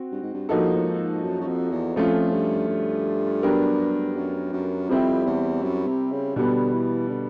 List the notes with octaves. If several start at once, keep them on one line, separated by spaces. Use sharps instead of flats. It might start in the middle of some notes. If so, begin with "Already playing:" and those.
Already playing: C4 F#4
G2
G#2
G2
G2 F3 A#3 D#4 F#4 A4
A2
G#2
F#2
F#2
F2
E2
F2 F3 A3 C#4 F4
G2
G2
F#3 B3 D4 G4 A#4
F#2
F#2
F2 G3 C4 E4 G4
E2
F#2
C3
C#3
B2 D3 G3 B3
E3
D3